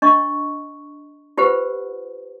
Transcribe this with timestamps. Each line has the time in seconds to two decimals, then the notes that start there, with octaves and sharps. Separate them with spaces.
0.02 D4 D#5 C#6
1.37 F4 G4 B4 C5 F#5